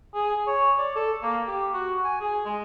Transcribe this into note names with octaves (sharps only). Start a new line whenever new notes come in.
G#4
C#5
D5
A4
A#3
G4
F#4
G#5
G#4
G#3